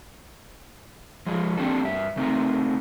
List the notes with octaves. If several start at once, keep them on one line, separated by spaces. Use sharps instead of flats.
F3 G#3 G#4 D#5
A#3 C4 D4 G4 A4
G2 E5
C#3 A3 C4 D#4 A#4